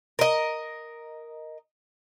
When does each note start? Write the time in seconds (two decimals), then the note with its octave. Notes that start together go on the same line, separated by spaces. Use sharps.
0.19 A#4 D#5